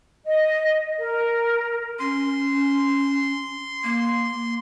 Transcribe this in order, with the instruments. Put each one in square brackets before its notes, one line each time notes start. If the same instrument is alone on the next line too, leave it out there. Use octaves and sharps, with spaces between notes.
[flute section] D#5
A#4
[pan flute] C#4 [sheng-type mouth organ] C6
[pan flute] A#3